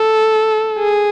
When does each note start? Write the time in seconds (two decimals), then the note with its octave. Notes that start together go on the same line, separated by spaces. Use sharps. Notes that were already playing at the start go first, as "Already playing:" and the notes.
Already playing: A4
0.79 G#4